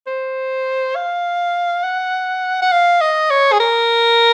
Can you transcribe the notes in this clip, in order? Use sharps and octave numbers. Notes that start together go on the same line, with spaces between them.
C5
F5
F#5
F#5
F5
D#5
C#5
G#4
A#4